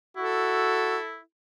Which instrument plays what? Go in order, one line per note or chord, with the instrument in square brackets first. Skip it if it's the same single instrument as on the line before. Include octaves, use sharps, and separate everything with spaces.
[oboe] E4 [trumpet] F#4 [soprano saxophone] A4